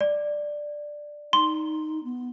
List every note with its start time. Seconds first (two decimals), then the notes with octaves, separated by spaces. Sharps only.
0.01 D5
1.33 D#4 C6
2.04 B3